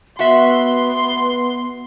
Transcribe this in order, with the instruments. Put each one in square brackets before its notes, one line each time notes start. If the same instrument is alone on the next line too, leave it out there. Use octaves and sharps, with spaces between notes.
[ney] B3 [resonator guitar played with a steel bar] F#4 E5 [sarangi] C6